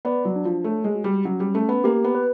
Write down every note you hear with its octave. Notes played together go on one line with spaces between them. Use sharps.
B3 D5
F#3
D4
F3
A3 C#5
G#3
F#4
G3
F#3 C#4
G3
A3 C#4
B3
A#3 G4
B3
B4